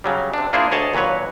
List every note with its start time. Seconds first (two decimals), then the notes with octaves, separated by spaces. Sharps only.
0.04 C#3 F#3 G3
0.34 C3 D4
0.53 A#3 D4 E4 F4 G#4 C5
0.71 D2 G#4 C#5 D#5 A5
0.93 D#2 A#2 F#3 B4 C#5